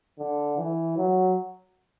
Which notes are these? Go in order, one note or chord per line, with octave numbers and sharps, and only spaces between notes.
D3
E3
F#3